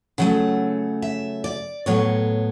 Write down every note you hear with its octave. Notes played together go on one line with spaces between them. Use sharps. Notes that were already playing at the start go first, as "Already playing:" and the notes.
C#3 F#3 A3 F#5
E5
D5
A2 F#3 B3 C#5